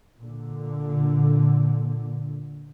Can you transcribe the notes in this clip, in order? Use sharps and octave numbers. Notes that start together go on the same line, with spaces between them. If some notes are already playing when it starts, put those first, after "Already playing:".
A#2 D3